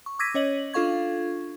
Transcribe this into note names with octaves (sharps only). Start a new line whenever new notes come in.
C#6
D6 E6 G#6 A#6 B6 D#7
C#4 C#5 D#5 F#7
D4 F4 A4 F5 C#6 G#6